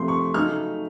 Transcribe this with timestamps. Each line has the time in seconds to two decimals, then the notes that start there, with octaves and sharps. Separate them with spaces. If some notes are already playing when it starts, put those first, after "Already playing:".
Already playing: C3 F3 A3 C6
0.08 C#6
0.34 C#3 F#3 A3 D#4 F6